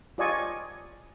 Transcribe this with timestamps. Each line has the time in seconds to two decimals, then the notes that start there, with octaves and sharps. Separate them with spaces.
0.18 F4 G4 D5 D#5 G#5 C#6